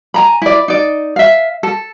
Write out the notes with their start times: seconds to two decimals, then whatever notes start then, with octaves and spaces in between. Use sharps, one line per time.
0.14 G#5 A#5 B5
0.42 E4 D5
0.68 D#4 D5
1.16 E5 F5
1.63 A4